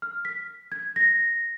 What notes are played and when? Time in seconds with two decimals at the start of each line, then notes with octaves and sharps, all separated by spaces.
0.02 F6
0.25 B6
0.72 G#6
0.96 A#6